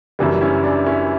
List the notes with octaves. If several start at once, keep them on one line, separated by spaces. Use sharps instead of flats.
F#1 F#2 E3 G3
C#4 E4
D4
C#4 E4